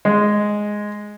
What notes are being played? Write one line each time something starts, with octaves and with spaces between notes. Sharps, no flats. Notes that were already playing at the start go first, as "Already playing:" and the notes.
G#3